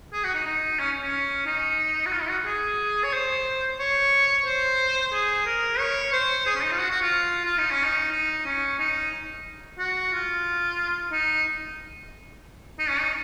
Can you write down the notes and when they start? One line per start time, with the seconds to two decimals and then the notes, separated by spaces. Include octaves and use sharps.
0.13 G#4
0.24 F#4
0.35 D#4
0.46 D#4
0.79 C#4
1.02 C#4
1.46 D#4
2.06 F#4
2.12 F4
2.21 D#4
2.29 F#4
2.46 G#4
3.04 C#5
3.13 C5
3.79 C#5
4.45 C5
5.13 G#4
5.46 A#4
5.79 C#5
6.13 C5
6.46 G#4
6.55 C#4
6.63 D#4
6.72 F4
6.79 F#4
6.90 F#4
7.01 F4
7.45 F4
7.58 D#4
7.71 C#4
7.84 D#4
8.12 D#4
8.46 C#4
8.79 D#4
9.78 F#4
10.13 F4
11.12 D#4
12.79 D#4
12.90 C#4
13.00 D#4